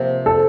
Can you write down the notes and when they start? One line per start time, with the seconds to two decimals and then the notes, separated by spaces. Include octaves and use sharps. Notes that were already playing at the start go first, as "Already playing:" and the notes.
Already playing: C3 F3 A#3
0.26 A4